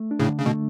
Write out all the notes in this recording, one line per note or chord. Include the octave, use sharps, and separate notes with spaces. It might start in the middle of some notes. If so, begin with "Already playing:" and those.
Already playing: A3
D4
A2 C#3
D3
C#3
B2 A3